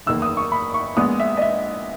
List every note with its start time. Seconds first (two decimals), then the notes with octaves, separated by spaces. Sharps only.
0.07 F#1 E2 D#3 A#3 E6
0.22 D#6
0.37 C#6
0.52 B5
0.74 C#6
0.96 A#1 A#2 G#3 B3 D#6
1.20 E5
1.37 D#5
1.42 E5